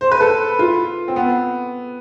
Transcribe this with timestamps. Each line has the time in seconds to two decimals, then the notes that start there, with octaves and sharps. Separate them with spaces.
0.01 C5
0.12 B4
0.21 A4
0.59 F4
1.08 C4
1.16 B3